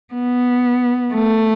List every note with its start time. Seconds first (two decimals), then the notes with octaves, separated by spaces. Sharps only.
0.14 B3
1.14 A3